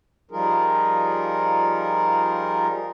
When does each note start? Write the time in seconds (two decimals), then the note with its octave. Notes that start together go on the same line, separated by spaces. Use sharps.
0.31 F3 G3 D#4 F4 G#4 A#4